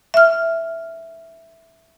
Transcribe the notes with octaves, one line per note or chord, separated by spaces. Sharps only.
E5 F6